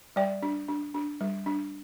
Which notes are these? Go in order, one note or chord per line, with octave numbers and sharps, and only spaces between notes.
G3 D5 G5
D4
D4
D4
G3
D4